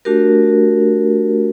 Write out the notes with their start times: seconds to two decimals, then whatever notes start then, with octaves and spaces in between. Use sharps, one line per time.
0.05 A3 D4 F#4 G4 A#4